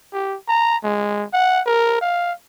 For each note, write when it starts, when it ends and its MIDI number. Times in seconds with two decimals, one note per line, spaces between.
0.13 0.37 67
0.48 0.77 82
0.83 1.24 56
1.33 1.61 78
1.66 1.98 70
2.01 2.32 77